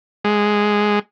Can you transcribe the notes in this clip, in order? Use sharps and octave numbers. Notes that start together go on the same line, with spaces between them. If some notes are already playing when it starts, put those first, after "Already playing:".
G#3